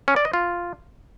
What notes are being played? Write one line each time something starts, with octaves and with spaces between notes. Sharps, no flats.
C#4
D5
D#5
F4